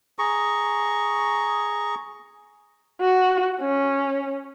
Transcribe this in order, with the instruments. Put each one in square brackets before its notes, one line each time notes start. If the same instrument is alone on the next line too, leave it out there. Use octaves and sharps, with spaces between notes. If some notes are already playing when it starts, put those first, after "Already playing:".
[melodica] G#4 A#5 C#6
[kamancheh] F#4
C#4